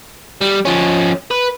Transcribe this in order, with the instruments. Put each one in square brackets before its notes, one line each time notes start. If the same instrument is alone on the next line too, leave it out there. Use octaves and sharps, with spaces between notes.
[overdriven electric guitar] G3
F3 C#4
B4